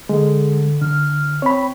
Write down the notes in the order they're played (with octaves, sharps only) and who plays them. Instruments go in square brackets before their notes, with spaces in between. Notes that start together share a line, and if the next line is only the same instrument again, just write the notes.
[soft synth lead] D3 [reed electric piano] G#3
[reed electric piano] D3 [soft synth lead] F6
[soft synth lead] C4 [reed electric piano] C#5 B5